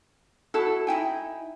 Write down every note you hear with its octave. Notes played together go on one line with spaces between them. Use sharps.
E4 F#4 A4
D#4 E4 G5 G#5